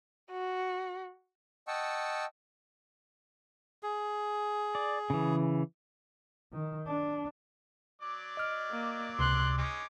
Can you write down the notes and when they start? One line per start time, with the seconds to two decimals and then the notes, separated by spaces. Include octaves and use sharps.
0.31 F#4
1.68 D#5 F#5 G5 A5 C#6 E6
3.83 G#4
4.75 D5
5.10 C#3 E3
6.53 D#3
6.87 D4
8.02 F#3 D5 D6
8.37 D#5 F6
8.71 A#3
9.19 C#2 C3 C6 F#6
9.58 G#3 C#4 D#4 D6